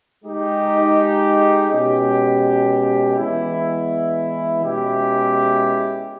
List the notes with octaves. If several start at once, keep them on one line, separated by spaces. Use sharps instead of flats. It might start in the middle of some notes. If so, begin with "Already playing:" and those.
G#3 D#4 G4
B2 G#3 C#4 G4
E3 G#3 B3 E4
B2 G#3 C#4 E4 G4